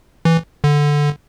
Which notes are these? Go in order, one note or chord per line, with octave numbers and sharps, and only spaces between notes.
E3
D3